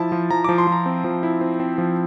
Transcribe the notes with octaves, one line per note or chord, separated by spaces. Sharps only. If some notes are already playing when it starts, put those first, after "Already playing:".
Already playing: F3 E4 A5
F3
F3 A#5
F3 D6
C6
F3 A#5
C4
F3
E4
C4
C4
F3